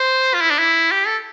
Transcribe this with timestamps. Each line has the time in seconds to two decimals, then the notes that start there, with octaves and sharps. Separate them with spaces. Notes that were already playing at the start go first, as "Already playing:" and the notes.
Already playing: C5
0.34 F4
0.41 E4
0.51 D4
0.59 E4
0.91 G4
1.07 A4